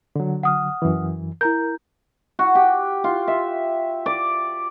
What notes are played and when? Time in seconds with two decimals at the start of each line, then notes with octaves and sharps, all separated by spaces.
0.16 D3 F#3
0.43 F#5 D#6 F6
0.82 F#2 E3
1.41 E4 A#4 A#5 G6
2.39 F#4
2.55 G4
3.04 F4
3.28 E5
4.06 D5